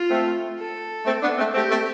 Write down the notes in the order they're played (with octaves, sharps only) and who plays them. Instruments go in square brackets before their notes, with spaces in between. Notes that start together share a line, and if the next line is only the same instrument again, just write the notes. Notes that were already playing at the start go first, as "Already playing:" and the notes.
Already playing: [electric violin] F4
[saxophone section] A3 C4
[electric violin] A4
[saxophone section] A3 C4
B3 D4
A3 C4
[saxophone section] A3 C4 [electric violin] G4
[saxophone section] A3 C4